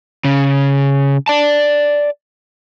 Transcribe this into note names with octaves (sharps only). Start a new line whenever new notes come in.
C#3
D5 A5